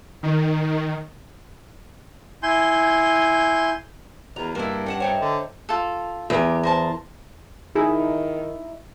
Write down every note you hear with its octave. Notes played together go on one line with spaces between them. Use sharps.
D#3
E4 G#5 C6 G6
E2 F#4 A#4 A#5
G2 A#3 E4
C#4 G4 F#5 A5
D#4 C5 C#5 E5 G5 A5
D3
F4 A4
E2 G4 A#4
A#4 C5 A5
D#3 D#4 E4 G#4